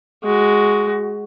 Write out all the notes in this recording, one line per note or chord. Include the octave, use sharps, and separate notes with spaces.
G#3 F#4